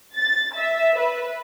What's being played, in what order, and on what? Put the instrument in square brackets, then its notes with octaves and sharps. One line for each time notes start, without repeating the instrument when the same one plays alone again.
[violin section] A6
E5
B4